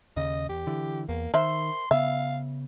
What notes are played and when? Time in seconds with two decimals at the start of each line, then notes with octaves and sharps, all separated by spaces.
0.17 D#2 C#3 D#5
0.49 E2 G4
0.67 D3 E3
1.09 E2 A#3
1.34 D#3 A#4 C5 E5 C6
1.91 C#3 B3 E5 F5